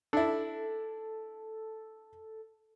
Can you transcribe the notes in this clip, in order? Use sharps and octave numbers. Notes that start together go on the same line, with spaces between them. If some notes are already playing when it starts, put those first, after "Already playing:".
D4 E4 A4